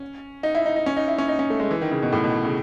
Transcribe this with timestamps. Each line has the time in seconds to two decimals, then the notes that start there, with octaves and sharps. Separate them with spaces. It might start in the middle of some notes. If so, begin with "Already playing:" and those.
Already playing: C#4
0.43 D#4
0.55 E4
0.66 D#4
0.76 D#4
0.86 C#4
0.97 D#4
1.08 E4
1.18 C#4
1.28 D#4
1.39 C#4
1.50 A3
1.60 G#3
1.71 E3
1.81 D#3
1.91 C#3
2.02 B2
2.13 A2
2.24 B2
2.45 C#3